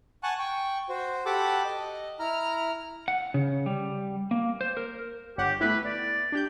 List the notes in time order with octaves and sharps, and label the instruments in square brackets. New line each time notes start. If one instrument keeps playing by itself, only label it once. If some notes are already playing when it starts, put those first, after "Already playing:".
[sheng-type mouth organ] F#5 G#5 A5 C#6 F#6
G5 C#6
F#4 C5
G4 A4 F#5 A5 B5 D6
D#5
E4 A#5 F6
[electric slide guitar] F#5
C#3
G3
A#3
C5
A#4
[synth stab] G1 C#5 F#5 [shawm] G4
[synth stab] A3 B3 E4 [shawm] B4
[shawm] D5
[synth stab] D4 G4 G6